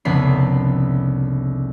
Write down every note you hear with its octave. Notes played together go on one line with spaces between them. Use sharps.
F1 C2 C#3 B3 B5 C7